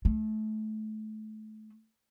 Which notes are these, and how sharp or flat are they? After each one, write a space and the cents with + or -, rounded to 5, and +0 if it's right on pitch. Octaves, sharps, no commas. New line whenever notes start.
A3 -25